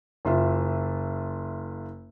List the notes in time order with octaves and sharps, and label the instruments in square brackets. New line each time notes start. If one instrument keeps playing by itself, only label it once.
[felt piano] F#1 F4 E5